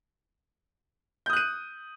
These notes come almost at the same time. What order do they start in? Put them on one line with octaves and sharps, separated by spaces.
G6 D#6 F#6 D#7